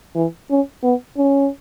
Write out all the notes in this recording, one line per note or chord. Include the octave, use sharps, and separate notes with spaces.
E3
C#4
B3
C#4